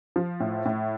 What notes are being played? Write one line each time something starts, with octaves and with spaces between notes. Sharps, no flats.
F3
A2
A2